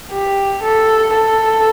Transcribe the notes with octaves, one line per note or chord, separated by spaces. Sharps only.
G4
A4
A4